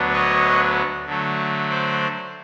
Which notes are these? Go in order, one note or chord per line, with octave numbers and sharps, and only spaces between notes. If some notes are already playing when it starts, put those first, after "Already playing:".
Already playing: D2 D3 F#3 B3 D4
C#5 D#5
D3 F#3 A3
C5 D5